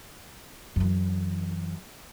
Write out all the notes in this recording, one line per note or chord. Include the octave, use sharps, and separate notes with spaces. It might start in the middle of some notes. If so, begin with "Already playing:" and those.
F#2 E3